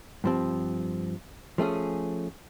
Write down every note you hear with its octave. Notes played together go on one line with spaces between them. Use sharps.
G2 F3 C4
F3 A3 C#4 G#4